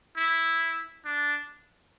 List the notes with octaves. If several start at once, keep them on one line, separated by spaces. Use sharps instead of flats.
E4
D4